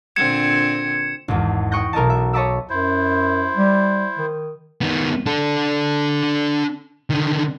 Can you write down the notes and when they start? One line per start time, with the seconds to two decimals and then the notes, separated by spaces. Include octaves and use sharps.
0.16 A#2 D3 C4 G#6 C#7 E7
1.28 G#1 E2
1.71 G5 C#6 D#6 F#6 G6 A#6
1.93 B1 A#4 D#5 A5
2.10 E5
2.33 C#5 D#5 A5 B5 D6 E6
2.70 F#2 E4 C5
3.56 G3
4.18 D#3
4.81 D#3 B3
5.26 D4 A4
7.10 D3 D#3